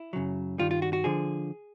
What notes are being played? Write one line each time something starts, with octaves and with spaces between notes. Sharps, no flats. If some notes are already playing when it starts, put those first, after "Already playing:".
Already playing: E4
F#2 C#3 F#3
G2 D#3 G3 F4
F4
F#4
F#4
D3 F3 G#4